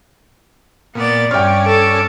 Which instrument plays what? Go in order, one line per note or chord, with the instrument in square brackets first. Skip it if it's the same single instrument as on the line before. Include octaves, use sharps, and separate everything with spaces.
[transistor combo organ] A#2 [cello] B3 D5
[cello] G2 [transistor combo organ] C#4 D5 [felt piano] G5 F6
[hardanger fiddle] A4